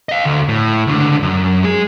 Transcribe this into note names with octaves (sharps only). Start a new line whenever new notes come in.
D#5 F5
D2
A2
C#2 D3
F#2
G#3 G#4